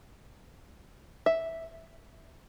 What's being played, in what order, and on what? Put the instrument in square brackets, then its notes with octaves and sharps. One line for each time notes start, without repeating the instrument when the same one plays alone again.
[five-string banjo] E5